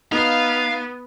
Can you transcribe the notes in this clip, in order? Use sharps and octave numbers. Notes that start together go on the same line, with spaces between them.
B3 D#4 F5